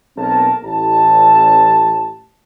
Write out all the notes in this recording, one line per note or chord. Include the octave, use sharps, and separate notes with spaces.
B1 B2 A#3 C4 A#4 A5
A1 A5